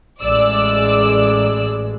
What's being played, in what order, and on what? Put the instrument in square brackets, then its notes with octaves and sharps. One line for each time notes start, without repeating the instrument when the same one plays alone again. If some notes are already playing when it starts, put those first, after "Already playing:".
[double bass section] A1 G#3 [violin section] D5 E6